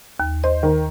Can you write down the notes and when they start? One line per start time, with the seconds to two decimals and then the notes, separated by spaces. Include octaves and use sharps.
0.20 D#2
0.44 C5 D#5
0.63 D#3